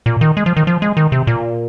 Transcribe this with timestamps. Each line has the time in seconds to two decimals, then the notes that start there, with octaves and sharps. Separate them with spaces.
0.06 A#2
0.21 D#3
0.37 G#3
0.46 F3
0.57 D#3
0.67 F3
0.82 G#3
0.97 D#3
1.12 C3
1.27 A#2